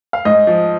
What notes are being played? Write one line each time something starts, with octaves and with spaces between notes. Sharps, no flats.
F5
G#2 D#5
F3